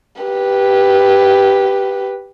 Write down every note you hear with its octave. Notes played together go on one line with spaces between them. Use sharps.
G4 B4